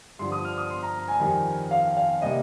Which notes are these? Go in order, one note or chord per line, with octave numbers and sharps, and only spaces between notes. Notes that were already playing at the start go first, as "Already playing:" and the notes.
G2 D3 F3 C6
D#6
F6
D#6
C6
A#5
G#5
F2 D#3 G3 G#5
F5
F5
C3 G3 A#3 D#5